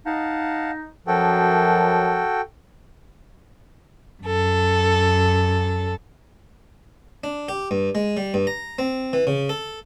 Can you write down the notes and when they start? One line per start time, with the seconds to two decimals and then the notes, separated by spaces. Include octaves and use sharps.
0.06 D#4 F5 F#5 A5
1.07 F#2 F3 F#4 A4 G5
4.22 F#2 A4
7.24 D4
7.49 G4
7.71 G2
7.95 G#3
8.17 G3
8.34 G2
8.47 A#5
8.79 C4
9.13 E3
9.27 C#3
9.49 A4